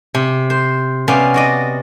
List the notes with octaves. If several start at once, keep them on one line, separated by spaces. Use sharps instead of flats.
C3
C5
C3 B3 C#4 D5 F5
F#4 D5 D#5